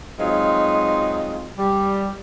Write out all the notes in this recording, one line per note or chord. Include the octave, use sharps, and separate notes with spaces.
F#3 G#3 C4 D#4 F4
G3